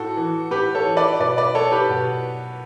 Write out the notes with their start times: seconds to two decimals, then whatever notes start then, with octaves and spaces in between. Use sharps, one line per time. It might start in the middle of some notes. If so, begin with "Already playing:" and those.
Already playing: A2 F#4 A4
0.17 E3
0.51 A2 G4 B4
0.75 A4 C#5
0.86 E3
0.97 B4 D5
1.20 B2 B4 D5
1.37 B4 D5
1.55 A4 C#5
1.72 G4 B4
1.90 B2